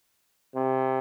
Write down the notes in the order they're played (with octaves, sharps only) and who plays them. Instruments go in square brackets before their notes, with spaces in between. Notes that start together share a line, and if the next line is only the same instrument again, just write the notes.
[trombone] C3